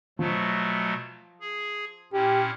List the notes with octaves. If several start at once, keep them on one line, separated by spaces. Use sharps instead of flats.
B2 F3 F#3 A3
G#4
A#2 C#4 E4 G4